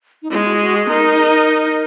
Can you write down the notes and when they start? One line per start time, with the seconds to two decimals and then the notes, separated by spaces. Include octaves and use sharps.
0.22 D#4
0.31 G#3 E4
0.46 F#4
0.60 F#4
0.76 G#4
0.89 D#4 A#4